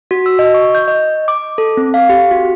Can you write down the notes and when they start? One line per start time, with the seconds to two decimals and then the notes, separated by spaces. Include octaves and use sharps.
0.11 F#4
0.26 E6
0.39 D#5
0.54 C#6
0.75 G6
0.88 D#5
1.28 D6
1.58 A4
1.77 C4
1.94 F5
2.09 G4
2.31 F#4